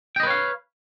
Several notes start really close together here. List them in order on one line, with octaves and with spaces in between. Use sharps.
G5 D#5 B4 C#5 F5